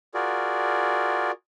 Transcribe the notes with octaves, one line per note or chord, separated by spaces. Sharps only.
F4 F#4 G#4 A#4 D5